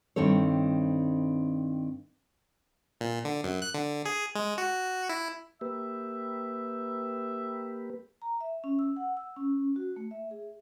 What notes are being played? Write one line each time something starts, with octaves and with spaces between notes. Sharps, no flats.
G2 D#3 C4 A4 C#5
A#2
D3
F#2
F#6
D3
G#4
G#3
F#4
E4
A#3 G4 B4 E5
A#5
E5
C#4
E6
F#5
E6
C#4
F#4
A3
E5
G#4